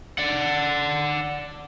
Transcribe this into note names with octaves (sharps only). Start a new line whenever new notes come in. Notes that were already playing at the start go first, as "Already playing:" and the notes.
D5 F#5